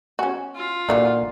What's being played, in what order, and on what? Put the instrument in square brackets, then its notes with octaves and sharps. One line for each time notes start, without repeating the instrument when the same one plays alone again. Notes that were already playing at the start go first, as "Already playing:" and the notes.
[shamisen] C#4 F#4 [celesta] G#5
[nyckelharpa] F4
[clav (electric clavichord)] A#2 [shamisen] D3 E3 F#4 [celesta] D5 F#5 D6